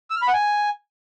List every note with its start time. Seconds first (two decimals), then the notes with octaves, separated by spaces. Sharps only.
0.10 E6
0.16 F6
0.22 B5
0.28 F#5
0.33 G#5